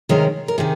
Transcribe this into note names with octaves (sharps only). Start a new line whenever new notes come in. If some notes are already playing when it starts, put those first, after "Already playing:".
C3 D#3 G#3 C#4 A#4
A#4
C3 D#3 G#4